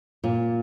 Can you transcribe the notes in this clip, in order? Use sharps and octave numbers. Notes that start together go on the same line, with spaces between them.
A#2